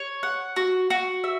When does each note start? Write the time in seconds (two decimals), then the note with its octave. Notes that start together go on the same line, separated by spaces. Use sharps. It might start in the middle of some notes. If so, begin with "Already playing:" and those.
Already playing: C#5
0.23 F#5
0.56 F#4
0.90 F#4
1.24 E5